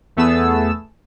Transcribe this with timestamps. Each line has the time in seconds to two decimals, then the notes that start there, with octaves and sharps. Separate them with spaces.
0.17 E2 A3 B3 G#4 A5 E6